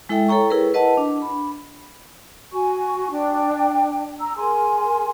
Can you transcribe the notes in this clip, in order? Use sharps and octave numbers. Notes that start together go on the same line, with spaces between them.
G#3 E4 A4 E5 G5
A4 C#5 G5 A#5 C#6
E4 G#4 A#4 B4
B4 D#5 F#5 A5
D4
B5
F#4 G#5 C#6
D4 G5
A#5 E6
G#4 A#4 G#5 C6